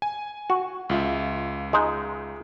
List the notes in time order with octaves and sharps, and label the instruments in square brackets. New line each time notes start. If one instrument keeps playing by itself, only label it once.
[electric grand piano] G#5
[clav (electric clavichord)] F#4
[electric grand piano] C#2 F4 E5
[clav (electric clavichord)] G#3 D#4